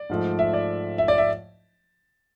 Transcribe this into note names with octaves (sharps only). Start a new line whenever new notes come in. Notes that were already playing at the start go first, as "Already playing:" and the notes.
Already playing: D5
G#2 F3 A3
E5
D5
E5
D5
E5